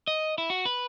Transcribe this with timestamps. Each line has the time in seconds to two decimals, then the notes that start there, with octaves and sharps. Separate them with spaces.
0.08 D#5
0.38 E4
0.50 F#4
0.65 B4